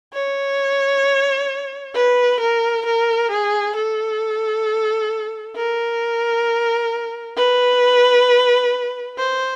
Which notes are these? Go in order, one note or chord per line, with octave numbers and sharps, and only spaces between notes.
C#5
B4
A#4
A#4
G#4
A4
A#4
B4
C5